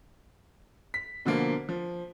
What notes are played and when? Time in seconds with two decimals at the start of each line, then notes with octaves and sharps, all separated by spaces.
0.94 B6
1.25 B2 D3 F3 A#3 F4
1.69 F3